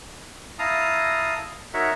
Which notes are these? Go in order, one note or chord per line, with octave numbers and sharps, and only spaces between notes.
E4 F5 A5 A#5 D#6
D#4 F#4 A#4 C#5 E5 F#5